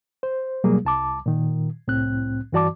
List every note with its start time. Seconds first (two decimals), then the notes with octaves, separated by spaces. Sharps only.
0.23 C5
0.64 B2 F#3 G3 A#3 G#4
0.85 C2 A5 D6
1.26 A#2 D#3
1.87 C2 A2 C4 F#6
2.53 G2 E3 F#4 D5 A5 D6